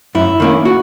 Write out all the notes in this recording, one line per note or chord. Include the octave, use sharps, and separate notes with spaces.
F#2 E4
D#3 A#3 C#4
F#4